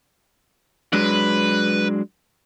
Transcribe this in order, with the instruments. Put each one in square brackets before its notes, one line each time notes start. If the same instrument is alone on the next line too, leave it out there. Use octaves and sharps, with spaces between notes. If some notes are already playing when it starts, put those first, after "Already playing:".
[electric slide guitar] F#3 G#3 D4 [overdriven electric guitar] B4